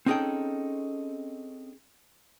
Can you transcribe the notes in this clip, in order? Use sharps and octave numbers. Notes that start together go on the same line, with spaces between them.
C4 C#4 D#4 G#4 A4 G5